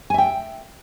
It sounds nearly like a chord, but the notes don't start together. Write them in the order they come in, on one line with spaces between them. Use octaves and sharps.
G#5 E5 G5